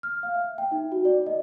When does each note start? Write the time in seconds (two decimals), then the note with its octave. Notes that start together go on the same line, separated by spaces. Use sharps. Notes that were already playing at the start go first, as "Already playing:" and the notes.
0.03 F6
0.23 F5
0.35 E5
0.58 G5
0.72 D#4
0.92 F#4
1.05 D5
1.26 D#5